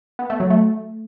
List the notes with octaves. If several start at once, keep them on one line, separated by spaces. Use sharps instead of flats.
B3
A3
F#3
A3